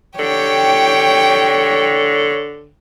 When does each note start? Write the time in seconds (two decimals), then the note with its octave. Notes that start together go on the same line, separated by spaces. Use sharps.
0.19 D3 G4 C#5 G5